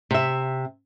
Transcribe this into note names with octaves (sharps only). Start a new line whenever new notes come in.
C3 E5